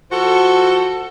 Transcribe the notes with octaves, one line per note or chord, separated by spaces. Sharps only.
F3 F#4 A4